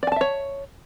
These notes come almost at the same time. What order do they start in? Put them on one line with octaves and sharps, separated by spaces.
D5 G#5 A5 E5 C#5